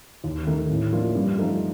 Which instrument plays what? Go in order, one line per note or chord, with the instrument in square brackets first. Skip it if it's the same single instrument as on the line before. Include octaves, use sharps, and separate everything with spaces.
[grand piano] D#2
D#3 A3 D#4
A2
F3 A#3 D4 F4
G2
F3 A3 D#4 A4